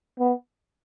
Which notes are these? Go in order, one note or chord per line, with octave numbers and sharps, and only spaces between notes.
B3